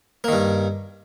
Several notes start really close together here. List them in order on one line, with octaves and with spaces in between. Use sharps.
A#3 D#3 G2